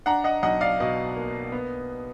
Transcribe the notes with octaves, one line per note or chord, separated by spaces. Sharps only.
D4 F#5 A#5
D#5 F#5
B1 D#5 F#5
D5 F5
B2 D#5
A#3
B3